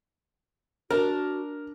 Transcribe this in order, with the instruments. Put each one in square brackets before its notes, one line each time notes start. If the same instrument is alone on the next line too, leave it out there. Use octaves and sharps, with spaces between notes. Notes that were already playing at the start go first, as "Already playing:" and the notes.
[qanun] D4 [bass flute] F#4 [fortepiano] A#4